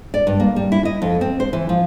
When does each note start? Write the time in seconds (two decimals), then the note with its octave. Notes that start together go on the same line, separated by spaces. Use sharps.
0.14 D5
0.27 G2
0.40 A#3
0.56 G3
0.72 E4
0.85 D#5
1.02 F2
1.21 C4
1.40 C5
1.53 E3
1.69 F3